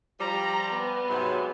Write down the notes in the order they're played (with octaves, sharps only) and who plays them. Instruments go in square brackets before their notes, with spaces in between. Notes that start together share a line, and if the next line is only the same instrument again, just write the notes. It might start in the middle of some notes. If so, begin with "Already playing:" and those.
[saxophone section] F3 G3 [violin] A#5
[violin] B3
[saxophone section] G#2 C3 F#3